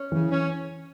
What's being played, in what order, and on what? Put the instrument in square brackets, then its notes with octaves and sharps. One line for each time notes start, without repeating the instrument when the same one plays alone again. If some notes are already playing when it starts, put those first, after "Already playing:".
Already playing: [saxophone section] C#4
[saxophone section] C#3 [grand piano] E3
[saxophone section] C#4